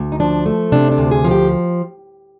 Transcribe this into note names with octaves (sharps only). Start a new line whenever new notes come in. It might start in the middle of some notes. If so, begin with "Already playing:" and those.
Already playing: D2
D#4
F3 D4
A3
C3 D4
D4
D2
G#4
F3
G4